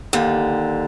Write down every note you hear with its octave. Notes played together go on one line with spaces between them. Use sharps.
D#2 D3